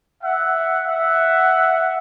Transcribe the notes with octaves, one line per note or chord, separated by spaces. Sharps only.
E5 F#5
E5 F#5